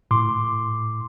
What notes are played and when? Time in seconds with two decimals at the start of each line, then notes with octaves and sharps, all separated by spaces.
0.11 A2 C6 D6